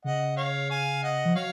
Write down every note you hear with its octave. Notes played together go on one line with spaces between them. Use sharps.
C#3 D#5 F#5
C#5 F5
F5 G#5
D#5 F#5
F3
F#3 C#5 F5